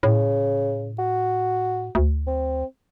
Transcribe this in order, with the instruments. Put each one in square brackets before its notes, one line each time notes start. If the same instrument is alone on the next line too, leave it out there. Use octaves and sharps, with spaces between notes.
[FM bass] A2 [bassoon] C#3
[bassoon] F#4
[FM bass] D2
[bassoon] C4